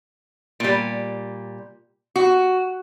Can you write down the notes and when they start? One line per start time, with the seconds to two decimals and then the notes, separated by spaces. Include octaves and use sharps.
0.60 A#2 G3
2.16 F#4